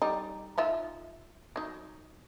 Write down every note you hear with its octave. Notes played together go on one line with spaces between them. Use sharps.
G3 D#4
D#4 F4 E5
F#3 D#4